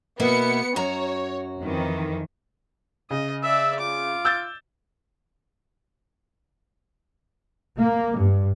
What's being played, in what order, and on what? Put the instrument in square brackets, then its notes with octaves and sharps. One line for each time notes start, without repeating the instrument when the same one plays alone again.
[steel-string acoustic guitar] B2 A#3 E4 [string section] B3 C#7
[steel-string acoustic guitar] F#2 F#4 A#5 [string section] C#5
[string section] F2 D#3 E3
[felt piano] C#3 [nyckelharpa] D#5
[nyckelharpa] D5 E5 [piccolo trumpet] E6
[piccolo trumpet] F4 [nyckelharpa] D6
[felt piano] E6 G6 A6
[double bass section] A#3
G2